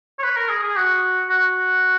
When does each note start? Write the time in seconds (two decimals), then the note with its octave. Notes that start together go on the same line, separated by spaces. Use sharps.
0.19 C#5
0.23 B4
0.36 A#4
0.49 G#4
0.63 G#4
0.76 F#4
1.30 F#4